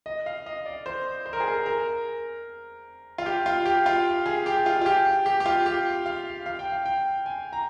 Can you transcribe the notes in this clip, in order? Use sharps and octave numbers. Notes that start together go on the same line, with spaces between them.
D#5
F5
D#5
D5
C5
C5
A#4
G#4
A#4
A#4
F4
G4
F4
G4
F4
G#4
G4
F4
F4
G4
G4
G4
F4
G4
F5
F5
G5
F5
G5
G#5
A#5